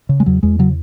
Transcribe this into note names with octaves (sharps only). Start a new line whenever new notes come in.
C#3
G#3
E2 F#3
E2 G#3
C#3 F#3